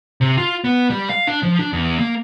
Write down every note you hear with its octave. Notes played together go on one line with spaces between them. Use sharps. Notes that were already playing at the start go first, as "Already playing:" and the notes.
C3
F4
B3
G3
F5
D4
F3
D4
E2
A#3